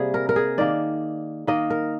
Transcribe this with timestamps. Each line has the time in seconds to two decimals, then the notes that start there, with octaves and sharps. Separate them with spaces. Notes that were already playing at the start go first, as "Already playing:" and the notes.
Already playing: C3 G3 A#3 G#4
0.14 A#4
0.29 A#4
0.36 G#4
0.58 D#3 A#3 D5
1.47 D#3 A#3 D#5
1.70 A#4